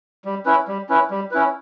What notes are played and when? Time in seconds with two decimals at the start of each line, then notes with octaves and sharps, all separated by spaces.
0.25 G3
0.46 C#4 E4 B4
0.68 G3
0.89 C#4 E4 B4
1.10 G3
1.31 C#4 E4 B4